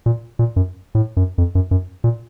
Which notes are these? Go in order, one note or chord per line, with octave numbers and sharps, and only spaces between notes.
A#2
A#2
F#2
A2
F#2
F2
F#2
F#2
A#2